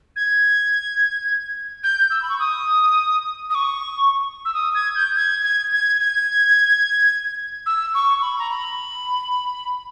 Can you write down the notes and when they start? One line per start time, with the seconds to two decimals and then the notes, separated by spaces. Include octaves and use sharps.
0.16 G#6
1.84 G6
2.10 E6
2.22 B5
2.30 C#6
2.39 D#6
3.50 D#6
3.55 C#6
4.45 E6
4.55 D#6
4.75 G#6
4.96 G6
5.16 G#6
5.44 G#6
5.73 G#6
6.00 G#6
7.66 E6
7.94 C#6
8.22 B5
8.39 A#5
8.50 B5